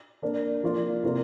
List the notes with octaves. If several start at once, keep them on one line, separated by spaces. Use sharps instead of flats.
A#3 D4 A#4
F3 A#3 F4 D5
C3 A#3 F4 A#4 D5